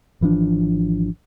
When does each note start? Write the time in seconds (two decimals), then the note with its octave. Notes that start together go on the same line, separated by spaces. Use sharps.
0.21 G#1 E3 F3 D4